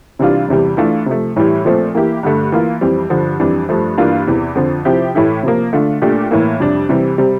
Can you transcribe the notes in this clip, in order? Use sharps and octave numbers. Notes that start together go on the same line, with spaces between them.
C3 E3 G3 D4 F4
E2 C3 E3 G3
E3 A3 D4 F4
C3 F3 A3
A2 E3 G3
A#2 F3 A3 C4
E3 A#3 E4 G4
G2 D3 A3
E3 A#3 F4
F2 E3 G3 C4
G2 D3 F3
F2 E3 G3 D4
G2 F3 A3
G2 E3 A#3 D4 F4
E2 C3 E3
F2 D3 F3
C3 F3 C4 E4 G4
A2 E3 A3 E4 G4
C3 F3 A#3
D3 A3 D4 F4
A#2 A3 D4 G4
A2 E3 A#3
F2 C3 G3 D4
C3 E3 G3 C4
C3 G3 C4